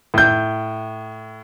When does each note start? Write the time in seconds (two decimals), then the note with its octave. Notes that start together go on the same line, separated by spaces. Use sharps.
0.14 A2 G6